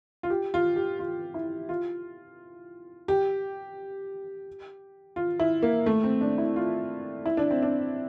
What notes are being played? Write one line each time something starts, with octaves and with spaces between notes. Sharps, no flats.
F4
G4
F4
G4
F4
E4
F4
G4
F4
E4
A#3
A3
C4
D4
E4
F4
E4
D4
C4
D4